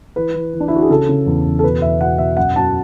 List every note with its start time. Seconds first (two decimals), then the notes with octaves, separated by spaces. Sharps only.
0.16 E3 B4
0.34 E3
0.54 E3
0.60 D4
0.68 E4
0.72 E3 F#4
0.82 G#4
0.89 C#3 A4
1.09 C#3
1.26 E2
1.46 E2
1.59 A4
1.64 B2 B4
1.82 E2 E5
2.00 B2 F#5
2.18 B2 E5
2.37 F#2 F#5
2.56 F#2 A5